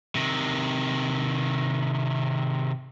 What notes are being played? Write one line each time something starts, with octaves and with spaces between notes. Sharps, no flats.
C3 D#3